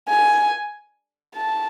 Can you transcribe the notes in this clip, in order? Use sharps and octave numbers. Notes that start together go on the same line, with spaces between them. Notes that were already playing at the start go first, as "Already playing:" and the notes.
G#5
A5